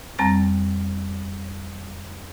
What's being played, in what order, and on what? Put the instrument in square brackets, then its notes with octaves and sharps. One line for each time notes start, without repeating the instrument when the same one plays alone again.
[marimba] F2 G3 C4 A#5 A6